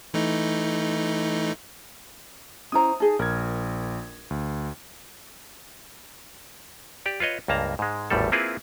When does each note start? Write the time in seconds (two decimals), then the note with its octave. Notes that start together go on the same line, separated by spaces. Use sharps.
0.14 E3 A3 D#4
2.72 C#4 E4 C5 A#5 D#6
3.00 D#4 G#4 G#5 A5
3.19 A#1 A#4 G#6
4.30 D2
7.06 G4 D5
7.20 F4 B4 C#5 D#5
7.48 C#2 G2 A#3 A5 A#5
7.79 G#2 G#3
8.10 G#1 E2 A2 G3 A4
8.32 A#3 C4 E4 F4 G#4 B4